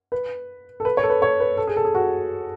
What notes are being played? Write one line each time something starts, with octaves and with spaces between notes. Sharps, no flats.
B4
A4
B4
C#5
A4
B4
C#5
B4
A4
G#4
A4
G#4
F#4